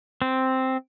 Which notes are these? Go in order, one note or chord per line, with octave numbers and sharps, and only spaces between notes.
C4